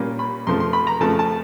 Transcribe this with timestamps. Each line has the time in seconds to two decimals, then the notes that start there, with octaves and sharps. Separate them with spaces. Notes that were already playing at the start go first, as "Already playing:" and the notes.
Already playing: A#2 G3 A#3 C#4
0.19 B5
0.47 F2 C#3 F3 A3 C6
0.60 C6
0.73 B5
0.87 A#5
1.00 F2 C#3 F3 A3 A5
1.19 A5